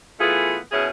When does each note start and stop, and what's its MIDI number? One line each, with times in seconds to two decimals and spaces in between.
0.20 0.58 52
0.20 0.58 57
0.20 0.58 59
0.20 0.58 65
0.20 0.58 68
0.72 0.89 47
0.72 0.89 61
0.72 0.89 64
0.72 0.89 68